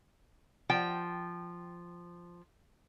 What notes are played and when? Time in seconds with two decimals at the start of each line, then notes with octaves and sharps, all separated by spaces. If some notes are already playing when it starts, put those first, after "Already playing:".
0.69 F3 G5